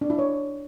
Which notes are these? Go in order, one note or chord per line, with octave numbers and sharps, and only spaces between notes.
D4
E4
C#5